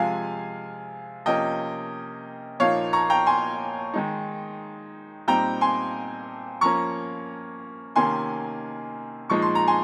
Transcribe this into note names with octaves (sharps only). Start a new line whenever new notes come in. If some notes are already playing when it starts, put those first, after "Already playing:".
Already playing: C3 F3 G#3 F5 G#5
C3 F3 A#3 C#4 D#5 G5
A#2 F3 A#3 D#4 C#5 F5
A#5 C#6
G5 A#5
G#5 C6
D#3 G#3 D#4
A#2 G3 C4 D#4 G5 A#5
G#5 C6
F3 A#3 C#4 A#5 C#6
C3 D#3 A#3 C#4 G#5 C6
A#2 F3 G#3 D#4 C#6
C6
A#5
G#5 C6